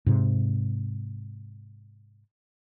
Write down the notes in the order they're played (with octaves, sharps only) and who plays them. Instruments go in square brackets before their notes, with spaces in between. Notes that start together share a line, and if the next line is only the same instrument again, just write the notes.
[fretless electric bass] G#2 C3